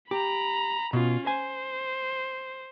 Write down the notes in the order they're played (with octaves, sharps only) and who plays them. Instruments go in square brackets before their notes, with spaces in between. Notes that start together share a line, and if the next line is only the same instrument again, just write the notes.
[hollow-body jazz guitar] G4 [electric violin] A#5 B5
[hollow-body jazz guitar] B2 [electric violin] C#4 F4
[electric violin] C5 [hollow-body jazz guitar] G#5